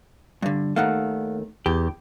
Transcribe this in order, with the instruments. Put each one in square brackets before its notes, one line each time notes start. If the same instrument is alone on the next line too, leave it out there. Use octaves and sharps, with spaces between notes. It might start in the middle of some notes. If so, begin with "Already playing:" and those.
[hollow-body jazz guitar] G2 D3
[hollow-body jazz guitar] D#2 D#3 A3 [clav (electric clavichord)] F5 F#5
[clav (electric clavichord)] E2 [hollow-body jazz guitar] G4